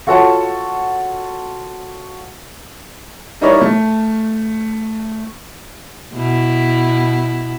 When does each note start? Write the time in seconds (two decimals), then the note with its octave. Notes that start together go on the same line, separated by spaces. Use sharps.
0.07 F4 F#4 A4 C#5 F#5 A5
3.41 G3 D#4 E4 A#4 C#5 D5
3.61 A3
6.13 B2 E4